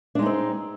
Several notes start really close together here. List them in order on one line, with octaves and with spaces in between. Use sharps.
D4 G#3 D#4 C4